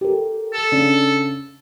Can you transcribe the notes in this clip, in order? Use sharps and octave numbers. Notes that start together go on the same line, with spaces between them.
G4 A4 A#4
A4
C#3 C#4 D4